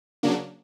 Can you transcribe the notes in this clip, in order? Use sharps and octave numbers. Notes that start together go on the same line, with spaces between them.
C#3 F#3 A#3 D4